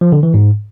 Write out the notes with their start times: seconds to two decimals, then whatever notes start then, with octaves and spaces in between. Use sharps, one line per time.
0.01 F3
0.12 D3
0.23 E3
0.34 G#2